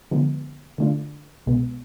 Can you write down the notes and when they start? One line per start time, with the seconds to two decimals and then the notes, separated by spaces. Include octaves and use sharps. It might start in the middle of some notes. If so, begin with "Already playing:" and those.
0.11 D3 F3 G#3 B3
0.78 D3 A3 D4 F4
1.46 C2 B2 G#3 B3